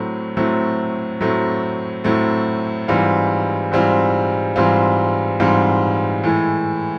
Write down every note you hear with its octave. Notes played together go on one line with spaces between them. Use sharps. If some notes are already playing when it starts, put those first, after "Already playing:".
Already playing: A2 F#3 A3 C4
A2 F#3 A3 C4
A2 F#3 A3 C4
A2 F#3 A3 C4
G#2 E3 G3 C4 F4
G#2 E3 G3 C4 F4
G#2 E3 G3 C4 F4
G#2 E3 G3 C4 F4
A2 E3 G#3